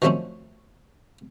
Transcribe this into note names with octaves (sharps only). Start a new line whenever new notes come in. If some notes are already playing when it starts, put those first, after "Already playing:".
D#3 F3 F#3 A3 C4 C#4